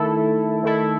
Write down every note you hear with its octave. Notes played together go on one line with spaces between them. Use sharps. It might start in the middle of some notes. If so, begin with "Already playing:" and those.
Already playing: D#3 A3 E4 A4
D#3 A3 E4 A4